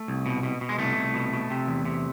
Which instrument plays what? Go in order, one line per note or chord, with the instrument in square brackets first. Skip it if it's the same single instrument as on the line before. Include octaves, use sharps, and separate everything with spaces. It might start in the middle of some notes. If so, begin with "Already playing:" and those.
Already playing: [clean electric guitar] A3
C2
B2
B2
B2
G#3
C2 A3
C2
B2
B2
C3
E2
C3